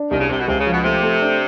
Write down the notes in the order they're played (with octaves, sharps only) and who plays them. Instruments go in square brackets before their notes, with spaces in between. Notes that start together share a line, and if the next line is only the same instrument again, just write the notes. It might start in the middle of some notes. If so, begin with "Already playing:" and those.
Already playing: [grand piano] D4
[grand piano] C2 [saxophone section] D#3
[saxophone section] C#3
[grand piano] C2 [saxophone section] C3
[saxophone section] B2
[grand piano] C#2 [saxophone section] C3
[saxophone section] C#3
[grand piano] F3
[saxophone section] B2
[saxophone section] C3 [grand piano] A3
[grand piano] A3
D4